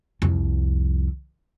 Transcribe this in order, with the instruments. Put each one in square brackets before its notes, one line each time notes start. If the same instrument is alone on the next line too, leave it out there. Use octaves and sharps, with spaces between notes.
[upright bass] C2 F2